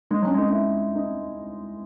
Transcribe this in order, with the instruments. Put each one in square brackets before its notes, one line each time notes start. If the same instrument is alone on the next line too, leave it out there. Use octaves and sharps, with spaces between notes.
[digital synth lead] G#3 [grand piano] D#4
[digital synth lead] F#3 [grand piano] C#4
[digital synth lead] G#3 [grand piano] D#4
[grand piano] D#4
E4
D#4